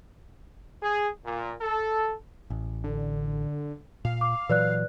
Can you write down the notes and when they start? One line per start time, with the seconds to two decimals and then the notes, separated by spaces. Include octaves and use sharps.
0.82 G#4
1.25 A#2
1.62 A4
2.50 A1
2.84 D3
4.05 A#2 F5
4.21 D6
4.49 A#2 E3 F#3 B4 D5 F#6